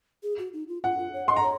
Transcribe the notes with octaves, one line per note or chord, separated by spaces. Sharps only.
G#4
F#4
D#4
F4
F4 F#5
F4
C#5
D#5 C6
A#5
C#5